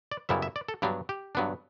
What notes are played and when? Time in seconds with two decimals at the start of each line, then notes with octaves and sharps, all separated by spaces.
0.12 D5
0.29 F#2 C#3 G3 B3 E4 E5
0.42 E5
0.56 D5
0.68 A4
0.82 G2 F#3 B3 D4 G4
1.09 G4
1.35 G2 F#3 B3 D4